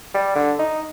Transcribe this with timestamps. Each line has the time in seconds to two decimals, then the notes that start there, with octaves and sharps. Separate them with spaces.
0.14 G3
0.35 D3
0.59 D#4